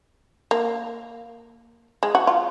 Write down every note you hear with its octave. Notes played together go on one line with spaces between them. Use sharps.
A#3
G#3
F#4
F4